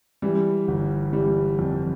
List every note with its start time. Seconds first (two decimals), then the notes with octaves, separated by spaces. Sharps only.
0.22 E3 G3
0.68 G1
1.13 E3 G3
1.59 F2